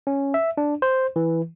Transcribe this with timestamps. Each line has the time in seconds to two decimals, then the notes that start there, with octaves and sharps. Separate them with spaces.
0.07 C#4
0.34 E5
0.57 D4
0.82 C5
1.16 E3